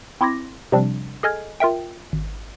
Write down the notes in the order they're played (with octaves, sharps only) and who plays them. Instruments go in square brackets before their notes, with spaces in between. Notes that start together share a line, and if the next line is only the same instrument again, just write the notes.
[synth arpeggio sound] C4 E4 C6 D6 G#6 A#6
C3 F3 G3 C4 D4
G#4 A4 D#5 G#5 F6 G#6
F4 A#4 E5 G5
G#1